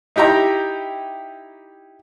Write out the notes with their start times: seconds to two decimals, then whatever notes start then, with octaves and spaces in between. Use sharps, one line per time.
0.16 D#4 E4 G4 G5 A#5